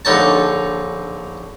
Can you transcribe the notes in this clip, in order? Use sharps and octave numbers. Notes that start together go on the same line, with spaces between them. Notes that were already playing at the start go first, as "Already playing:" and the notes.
A#1 D3 D#4 C#5 A5